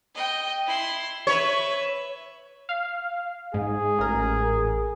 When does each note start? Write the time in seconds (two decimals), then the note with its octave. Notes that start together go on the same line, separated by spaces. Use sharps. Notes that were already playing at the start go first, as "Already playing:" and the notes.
0.15 D#5 G5
0.66 E4 C6
1.27 B4 C#5 E5
2.69 F5
3.54 G#2 G#4
3.99 A1 A#4